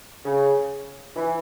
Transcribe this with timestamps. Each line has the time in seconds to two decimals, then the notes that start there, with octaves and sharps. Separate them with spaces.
0.24 C#3
1.15 E3